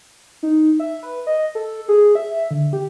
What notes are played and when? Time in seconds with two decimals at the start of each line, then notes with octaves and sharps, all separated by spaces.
0.43 D#4
0.80 E5
1.03 B4
1.27 D#5
1.55 A4
1.88 G#4
2.15 E5
2.51 D3
2.73 G4